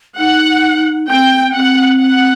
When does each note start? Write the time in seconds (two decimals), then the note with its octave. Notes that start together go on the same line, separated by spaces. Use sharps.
0.18 D#4 F#5
1.09 C4 G5
1.54 C4 F#5
2.00 F#5